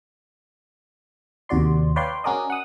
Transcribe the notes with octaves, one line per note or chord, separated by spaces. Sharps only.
D#2 C3 F#4 D5 C6
B4 C#5 D5 F5 G5 C6
C#4 F#4 G#4 A#4 D5 D#5
F#5 D#6